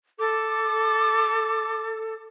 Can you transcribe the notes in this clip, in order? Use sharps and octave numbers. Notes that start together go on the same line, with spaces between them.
A4 D6